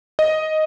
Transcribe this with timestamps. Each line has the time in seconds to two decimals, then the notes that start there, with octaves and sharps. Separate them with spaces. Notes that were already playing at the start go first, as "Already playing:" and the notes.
0.19 D#5